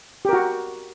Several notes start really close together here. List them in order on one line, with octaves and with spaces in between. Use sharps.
G4 A#4 F#4